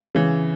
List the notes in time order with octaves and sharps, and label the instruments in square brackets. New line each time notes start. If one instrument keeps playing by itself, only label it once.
[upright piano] C#3 E3